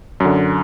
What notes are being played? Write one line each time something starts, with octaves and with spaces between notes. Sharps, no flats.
F#2 D3